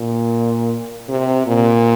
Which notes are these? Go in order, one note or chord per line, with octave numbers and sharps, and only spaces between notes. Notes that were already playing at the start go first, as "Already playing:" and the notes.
Already playing: A#2
C3
A#2